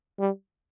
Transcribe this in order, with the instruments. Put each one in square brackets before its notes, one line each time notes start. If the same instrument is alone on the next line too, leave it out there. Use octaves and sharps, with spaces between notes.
[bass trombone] G3